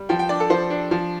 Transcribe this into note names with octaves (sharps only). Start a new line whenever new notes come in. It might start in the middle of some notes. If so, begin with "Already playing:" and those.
Already playing: G3
F3 G5
G5
D4 D5
A4
F3 C5
D4
F3